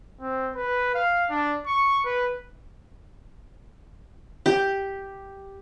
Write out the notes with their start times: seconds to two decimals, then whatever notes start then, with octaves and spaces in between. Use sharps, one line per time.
0.20 C4
0.55 B4
0.94 F5
1.29 D4
1.66 C#6
2.05 B4
4.46 G4